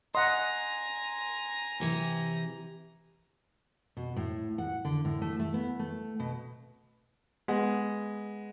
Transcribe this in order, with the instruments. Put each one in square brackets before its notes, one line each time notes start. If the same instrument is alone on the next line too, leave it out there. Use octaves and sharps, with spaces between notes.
[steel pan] D#5 F#5 [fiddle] G#5 A#5 [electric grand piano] C6
[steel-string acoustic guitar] C3 E3 G4
B2
A2
F#5
D3
A2
A3
A3
B3
A3
B2
[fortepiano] G#3 B3 F#5